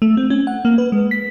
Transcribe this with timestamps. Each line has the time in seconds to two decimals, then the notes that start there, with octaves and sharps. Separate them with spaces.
0.02 A3
0.17 C4
0.30 C#4
0.47 F#5
0.65 A#3
0.78 B4
0.92 G#3
1.11 B6